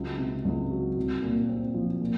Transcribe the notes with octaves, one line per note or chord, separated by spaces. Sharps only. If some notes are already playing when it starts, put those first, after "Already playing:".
Already playing: C#2 F#3
C3
C#2
F#3
C2
A#2
C4
F3
A#2